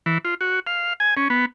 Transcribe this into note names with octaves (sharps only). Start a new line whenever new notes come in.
E3
F4
F#4
F5
G#5
C#4
B3